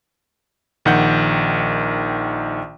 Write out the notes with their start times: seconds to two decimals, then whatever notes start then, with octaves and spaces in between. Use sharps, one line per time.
0.85 A#1 D#3 F#5 G6